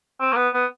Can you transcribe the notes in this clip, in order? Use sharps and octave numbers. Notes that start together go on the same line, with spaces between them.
C4
A#3
B3
B3